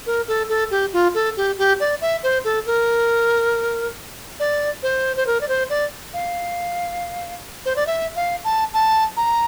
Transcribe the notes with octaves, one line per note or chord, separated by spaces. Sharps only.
A#4
A4
A4
G4
F4
A4
G4
G4
D5
E5
C5
A4
A#4
D5
C5
C5
A#4
D5
C5
D5
F5
C5
D5
E5
F5
A5
A5
A#5